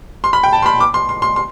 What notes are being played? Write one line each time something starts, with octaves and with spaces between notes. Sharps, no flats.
C6
B5
G5
A5
C6
B5
D6
C6
C6
C6
C6